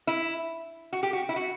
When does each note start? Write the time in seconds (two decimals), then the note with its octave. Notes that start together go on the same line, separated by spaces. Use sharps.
0.07 E4
0.93 F#4
1.03 G4
1.13 F#4
1.29 E4
1.36 F#4